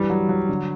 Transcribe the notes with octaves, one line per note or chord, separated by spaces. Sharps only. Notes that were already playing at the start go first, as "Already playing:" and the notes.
Already playing: G2 E3 G3
F#3
F#3
D3